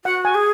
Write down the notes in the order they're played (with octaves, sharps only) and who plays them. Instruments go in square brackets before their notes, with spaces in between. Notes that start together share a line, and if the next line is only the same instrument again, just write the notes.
[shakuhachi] F#4 [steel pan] F#5
[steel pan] G#5
[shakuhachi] G#4